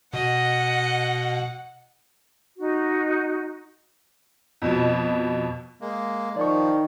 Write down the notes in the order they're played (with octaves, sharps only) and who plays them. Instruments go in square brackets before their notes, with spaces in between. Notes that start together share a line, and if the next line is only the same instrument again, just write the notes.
[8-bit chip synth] B2 [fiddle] D#5 [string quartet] F#5
[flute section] D#4 F#4
[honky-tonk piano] F2 B2
[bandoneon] G#3 A#3
[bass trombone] D#3 [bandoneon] F3 [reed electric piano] D5 C#6